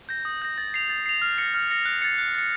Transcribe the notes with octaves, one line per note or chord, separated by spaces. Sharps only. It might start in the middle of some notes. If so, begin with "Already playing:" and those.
G6 A#6
D#6
G6 A#6
A6
C7 F7
A6
C7 F7
F6
A#6 C#7
F6
A#6 C#7
F#6
A6 C#7
F#6
A6 C#7